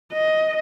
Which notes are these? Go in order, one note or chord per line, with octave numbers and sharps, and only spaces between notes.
D#5